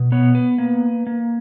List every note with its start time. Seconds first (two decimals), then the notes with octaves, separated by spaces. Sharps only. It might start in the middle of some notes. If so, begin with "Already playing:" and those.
Already playing: B2
0.12 B3 C#5
0.35 B4
0.58 A#3
1.07 A#3